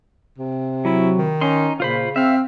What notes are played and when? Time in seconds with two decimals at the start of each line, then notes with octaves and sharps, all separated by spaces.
0.38 C3
0.85 F#3 E4
1.18 D#3
1.41 C#4 D#4 C6
1.80 A#2 C#3 F4 C5 B5
2.16 C4 E5 F5